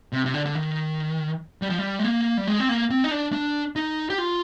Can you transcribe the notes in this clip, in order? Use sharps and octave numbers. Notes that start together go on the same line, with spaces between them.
C3
C3
D3
D3
D#3
G3
F3
G3
G#3
A#3
G3
G#3
C4
A#3
C4
D#4
D4
D4
D#4
G4
F4